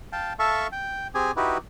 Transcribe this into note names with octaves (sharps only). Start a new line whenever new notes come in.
F5 G5 A5
A4 E5 F5 A5 C#6
G5
C4 G4 G#4 G#5
D#4 E4 F#4 G4 B4